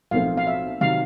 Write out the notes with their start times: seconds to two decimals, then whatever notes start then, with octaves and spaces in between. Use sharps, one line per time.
0.11 B1 A2 F3 A3 C4 F5
0.37 F5
0.47 E5
0.81 C3 D#3 F#3 F5